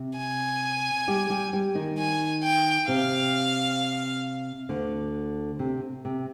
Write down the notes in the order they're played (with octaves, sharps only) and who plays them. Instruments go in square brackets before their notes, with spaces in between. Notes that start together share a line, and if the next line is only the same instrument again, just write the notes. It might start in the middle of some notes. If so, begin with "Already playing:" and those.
Already playing: [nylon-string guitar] C3
[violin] G#5
[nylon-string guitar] G3 G4
G3 G4
G3 G4
D#3 D#4
[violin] G#5
G5
[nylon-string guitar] C3 C4 [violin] F5
[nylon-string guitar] D2 D3
C3
C3